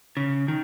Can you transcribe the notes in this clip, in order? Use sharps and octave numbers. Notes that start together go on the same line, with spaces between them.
C#3
D#3